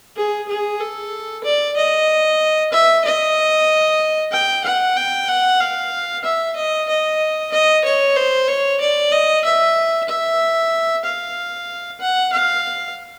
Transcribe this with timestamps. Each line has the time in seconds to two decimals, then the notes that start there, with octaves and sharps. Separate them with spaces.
0.16 G#4
0.48 G#4
0.80 A4
1.44 D5
1.76 D#5
2.72 E5
3.05 D#5
4.32 G5
4.64 F#5
4.96 G5
5.28 F#5
5.60 F5
6.24 E5
6.56 D#5
6.88 D#5
7.52 D#5
7.85 C#5
8.17 C5
8.48 C#5
8.80 D5
9.12 D#5
9.45 E5
10.09 E5
11.04 F5
12.00 F#5
12.33 F5